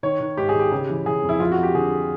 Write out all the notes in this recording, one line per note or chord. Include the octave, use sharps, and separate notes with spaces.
D#3 C#5
D#3
G#2 G4
G#4
D#3
G4
C#3 G4
E3
E3 G#4
F2
E4
F2 F4
F#4
F2
G4
D3 G#4